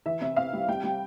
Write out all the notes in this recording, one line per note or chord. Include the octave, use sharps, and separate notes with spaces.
E3 E5
C3 E5
C3 F5
G3
G3 G5
G3